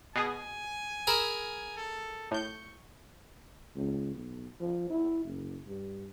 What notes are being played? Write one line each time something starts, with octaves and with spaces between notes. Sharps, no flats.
B2 G#4 G#5
G#4 A#4 B5 E6
A4
A2 C#6 G6
C#2
B1
F3
E4
F#1
G2